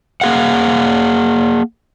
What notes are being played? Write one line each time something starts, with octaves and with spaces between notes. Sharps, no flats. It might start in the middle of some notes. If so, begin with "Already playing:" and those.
A#3 G#4 F5 F#5